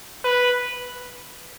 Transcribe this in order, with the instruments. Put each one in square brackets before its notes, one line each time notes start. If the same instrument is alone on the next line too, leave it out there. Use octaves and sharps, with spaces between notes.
[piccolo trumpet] B4